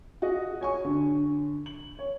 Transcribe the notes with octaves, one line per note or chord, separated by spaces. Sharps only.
F4 F#4 G#4 D#5
C#5 G#5 C#6
D3
F#7
C#5